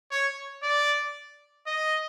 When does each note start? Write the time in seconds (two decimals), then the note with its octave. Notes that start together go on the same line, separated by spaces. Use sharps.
0.11 C#5
0.63 D5
1.67 D#5